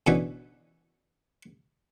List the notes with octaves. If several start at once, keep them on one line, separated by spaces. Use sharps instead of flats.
B2 D3 E3 B3 C#4